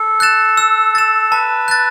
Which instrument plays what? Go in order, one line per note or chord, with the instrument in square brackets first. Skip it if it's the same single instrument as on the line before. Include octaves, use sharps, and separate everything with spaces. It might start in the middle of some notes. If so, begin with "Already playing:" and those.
Already playing: [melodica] A4
[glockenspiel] F#6 A6 E7
E6
A6 E7
[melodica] B4 [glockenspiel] A5
[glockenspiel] F#6 A6